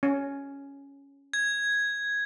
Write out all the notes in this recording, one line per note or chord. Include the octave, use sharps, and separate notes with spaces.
C#4
G#6